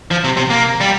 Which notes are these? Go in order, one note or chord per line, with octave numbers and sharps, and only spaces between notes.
F3
C3
C3
A#3
G3